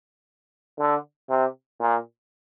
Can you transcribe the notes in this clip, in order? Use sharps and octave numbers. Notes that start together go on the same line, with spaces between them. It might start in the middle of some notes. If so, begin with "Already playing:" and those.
D3
C3
A#2